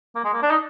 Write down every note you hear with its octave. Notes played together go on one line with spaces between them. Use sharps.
A#3
G#3
A#3
D4
D#4